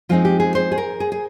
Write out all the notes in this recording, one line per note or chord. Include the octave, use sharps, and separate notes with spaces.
F3 G#3 C4 D#4 F4
G4
G#4
C5
G#4
A#4
G#4
G#4